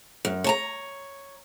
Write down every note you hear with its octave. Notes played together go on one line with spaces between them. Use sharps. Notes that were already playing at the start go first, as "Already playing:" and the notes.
F#2
C#5 A5 A#5